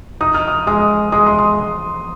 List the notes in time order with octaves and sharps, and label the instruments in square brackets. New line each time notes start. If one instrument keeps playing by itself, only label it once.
[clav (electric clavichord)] D#4 [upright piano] D#6
[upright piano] F6
D#6
[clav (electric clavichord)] G#3 [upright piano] D#6
[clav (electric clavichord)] G#3 [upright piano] D#6
[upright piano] C6
D#6